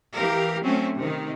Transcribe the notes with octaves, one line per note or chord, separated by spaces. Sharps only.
E3 G4 A#4 F5
F#3 A3 C4 C#4
C3 D#3